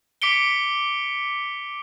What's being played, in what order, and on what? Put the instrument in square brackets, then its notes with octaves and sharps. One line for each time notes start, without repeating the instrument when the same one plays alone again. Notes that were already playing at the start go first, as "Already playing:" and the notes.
[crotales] D6 B6 C#7 D7 G7